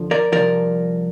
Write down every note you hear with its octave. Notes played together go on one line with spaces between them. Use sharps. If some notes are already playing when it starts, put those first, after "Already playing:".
Already playing: F2 D3 F3
A#4 D5
C2 A#2 F3 A#4 D5